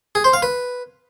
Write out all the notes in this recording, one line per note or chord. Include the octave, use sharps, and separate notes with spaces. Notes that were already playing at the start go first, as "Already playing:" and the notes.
G#4
C5
F5
B4